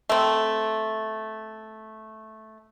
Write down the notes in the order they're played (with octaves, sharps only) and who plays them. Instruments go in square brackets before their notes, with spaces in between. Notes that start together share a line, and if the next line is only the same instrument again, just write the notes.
[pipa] A3 C4